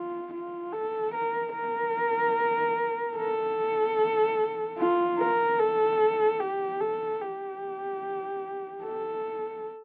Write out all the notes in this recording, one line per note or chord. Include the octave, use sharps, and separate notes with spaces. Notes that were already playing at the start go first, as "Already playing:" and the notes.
Already playing: F4
F4
A4
A#4
A#4
A4
F4
A#4
A4
G4
A4
G4
A4